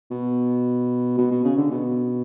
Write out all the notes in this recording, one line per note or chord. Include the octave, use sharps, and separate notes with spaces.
B2
B2
B2
C#3
D3
B2